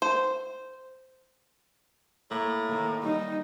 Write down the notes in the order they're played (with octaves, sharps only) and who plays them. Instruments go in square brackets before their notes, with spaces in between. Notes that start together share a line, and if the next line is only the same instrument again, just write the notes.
[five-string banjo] C5
[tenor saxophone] A2 [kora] A#3
[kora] D#3 A#3
[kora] G3 [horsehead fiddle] D#4